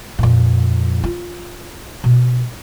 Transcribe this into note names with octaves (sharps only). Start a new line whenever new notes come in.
F2 A#2
F4
B2